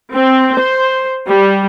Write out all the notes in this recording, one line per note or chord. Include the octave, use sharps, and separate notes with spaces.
C4
C5
G3